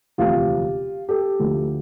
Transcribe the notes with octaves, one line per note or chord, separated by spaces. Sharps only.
E1 D2 C3 F3 F4 G4
G4 A4
D2 D3 F3